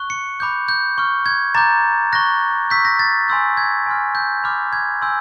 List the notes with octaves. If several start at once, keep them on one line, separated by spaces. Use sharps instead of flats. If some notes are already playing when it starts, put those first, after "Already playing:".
Already playing: C#6 F#6
C#7
B5 D6 G6
G6
C#6 F6
G#6
A#5 D6 G6 A6
C#6 F#6 A#6
C#6 E6 G6 B6
A#6
A6
G#5 C6 E6 G6
G#6
G#5 C6 F6
G6
B5 D6 F6
G#6
G#5 C6 E6 G6